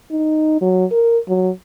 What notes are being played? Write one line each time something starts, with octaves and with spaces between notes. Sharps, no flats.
D#4
F#3
A#4
F#3